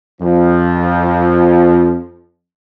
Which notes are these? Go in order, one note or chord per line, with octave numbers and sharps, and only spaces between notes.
F2 F3